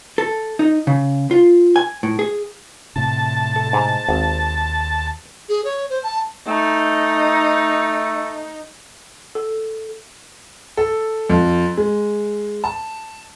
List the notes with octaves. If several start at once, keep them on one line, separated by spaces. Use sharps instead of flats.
A4
D#4
C#3
F4
G#5
A2
G#4
A2 C3 A5
A4
G#2 A#5
G#1 D#2
G#4
C#5
C5
A5
A3 D#4
A4
A4
F2
G#3
A5